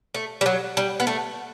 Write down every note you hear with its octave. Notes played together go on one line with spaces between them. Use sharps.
A3
G3
F#3
G3
B3
A3